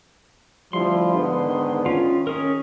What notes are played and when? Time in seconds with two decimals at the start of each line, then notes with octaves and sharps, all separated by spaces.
0.73 D2 F3 G3 E4 C6
1.14 G#2 D3 B3
1.43 D#3
1.86 D#3 C#4 F4
2.27 C#4 G#4 A#4